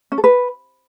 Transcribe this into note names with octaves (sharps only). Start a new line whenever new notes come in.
C#4
A4
B4